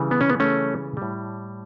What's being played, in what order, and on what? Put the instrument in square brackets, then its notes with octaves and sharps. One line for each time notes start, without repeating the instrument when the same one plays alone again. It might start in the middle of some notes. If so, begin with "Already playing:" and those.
Already playing: [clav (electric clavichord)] C#3 E3 G3
B3
C#4
B3
A3 C#4
A2 G3